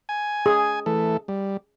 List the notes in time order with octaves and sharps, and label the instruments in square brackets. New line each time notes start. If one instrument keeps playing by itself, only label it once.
[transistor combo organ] G#5
[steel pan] G#4
[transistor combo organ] E3 A3 A4
G3